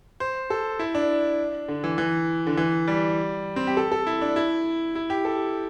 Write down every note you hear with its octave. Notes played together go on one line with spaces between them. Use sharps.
C5
A4
E4
D4
D3
E3
E3
D3
E3
G3
C4
G4
A4
A4
E4
D4
E4
E4
G4
A4